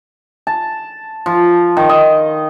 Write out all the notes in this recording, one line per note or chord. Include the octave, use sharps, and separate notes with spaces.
A5
F3
D#3
D#5